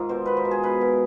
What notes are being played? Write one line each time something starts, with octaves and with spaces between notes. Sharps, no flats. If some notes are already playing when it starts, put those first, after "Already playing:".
Already playing: G#2 D#3 D#4 F4
B2 C5
B2 B4
C5
B2
G#4
B2 B4
B2